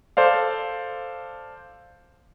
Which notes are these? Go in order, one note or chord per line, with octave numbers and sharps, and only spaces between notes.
A4 C5 D5 F5